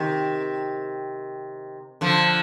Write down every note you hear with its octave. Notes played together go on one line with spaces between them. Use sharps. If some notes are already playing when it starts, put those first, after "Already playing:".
Already playing: C3 D#3
D3 F3